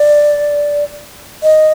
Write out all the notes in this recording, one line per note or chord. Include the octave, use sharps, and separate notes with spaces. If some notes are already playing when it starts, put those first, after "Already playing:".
Already playing: D5
D#5